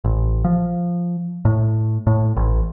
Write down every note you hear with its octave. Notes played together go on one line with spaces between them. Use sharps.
A1
F3
A2
A2
A1